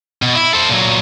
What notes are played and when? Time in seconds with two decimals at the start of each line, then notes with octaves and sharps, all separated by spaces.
0.22 B2
0.35 E4
0.53 A4 C5
0.69 A#2 F#3